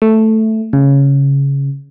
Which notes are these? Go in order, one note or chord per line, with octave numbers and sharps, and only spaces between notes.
A3
C#3